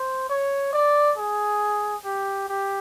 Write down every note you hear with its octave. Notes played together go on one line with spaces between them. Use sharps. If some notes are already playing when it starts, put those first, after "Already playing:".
Already playing: C5
C#5
D5
G#4
G4
G4